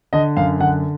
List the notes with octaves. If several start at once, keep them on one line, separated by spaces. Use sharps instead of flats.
D3 D#5
F#2 F5
D3 F#5